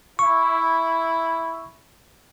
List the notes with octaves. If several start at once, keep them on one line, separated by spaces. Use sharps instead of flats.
E4 C#6